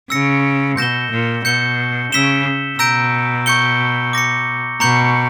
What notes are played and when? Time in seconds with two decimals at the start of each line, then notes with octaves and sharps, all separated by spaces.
0.10 C#3 E6 A#6 C#7
0.77 B2 G6 A#6 E7 G7
1.11 A#2
1.45 B2 G6 C#7 G7
2.12 C#3 E6 B6 E7 G7
2.79 B2 A#5 E6 G6 A#6 D7
3.46 C#6 G6 C#7 G7
4.13 D6 A#6 C#7
4.80 B2 A#5 C#6 G6 C#7 F#7